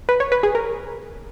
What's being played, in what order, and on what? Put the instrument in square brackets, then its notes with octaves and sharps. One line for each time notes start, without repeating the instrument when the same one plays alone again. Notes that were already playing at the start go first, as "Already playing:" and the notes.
[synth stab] B4
C#5
B4
G#4
A#4